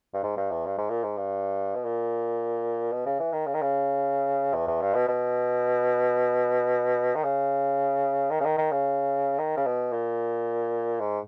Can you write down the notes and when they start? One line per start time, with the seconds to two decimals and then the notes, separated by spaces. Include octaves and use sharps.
0.14 G2
0.23 G#2
0.37 G2
0.50 E2
0.66 G2
0.77 G#2
0.90 A#2
1.03 G#2
1.17 G2
1.75 B2
1.85 A#2
2.92 B2
3.06 C#3
3.19 E3
3.33 D#3
3.46 C#3
3.54 D#3
3.61 C#3
4.54 E2
4.67 E2
4.81 G2
4.95 B2
5.08 B2
7.15 D#3
7.23 C#3
8.30 D#3
8.40 C#3
8.45 D#3
8.57 D#3
8.72 C#3
9.39 D#3
9.57 C#3
9.66 B2
9.92 A#2
11.00 G#2